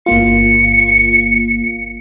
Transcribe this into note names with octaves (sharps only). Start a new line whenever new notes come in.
G1 A#3 F4 C#7